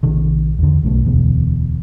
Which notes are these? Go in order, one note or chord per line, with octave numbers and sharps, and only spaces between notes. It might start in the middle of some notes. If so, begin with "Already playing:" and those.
A#1 C3 D#3
E2 D3
B1 B2 A3
E1 D2 B2 E3